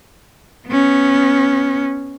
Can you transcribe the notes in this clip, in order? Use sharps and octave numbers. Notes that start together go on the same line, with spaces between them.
B3 C#4